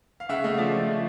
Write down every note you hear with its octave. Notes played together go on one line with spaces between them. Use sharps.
F5
C#3 E5 F#5
A3 D#5 F5
F3 D5 E5
F3
C#3